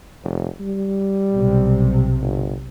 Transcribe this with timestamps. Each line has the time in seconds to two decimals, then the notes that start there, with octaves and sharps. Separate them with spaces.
0.24 F1
0.61 G3
1.32 B1 C3
2.22 G1